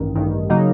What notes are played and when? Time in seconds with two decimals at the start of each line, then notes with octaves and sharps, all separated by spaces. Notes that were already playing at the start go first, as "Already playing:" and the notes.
Already playing: A1 G2 D#3
0.15 A1 G2 D#3
0.50 C#3 F#3 A#3 D#4